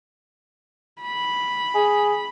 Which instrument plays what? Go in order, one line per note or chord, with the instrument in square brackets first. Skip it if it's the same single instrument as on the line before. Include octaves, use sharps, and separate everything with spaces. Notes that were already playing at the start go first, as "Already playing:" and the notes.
[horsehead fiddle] B5
[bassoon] G#4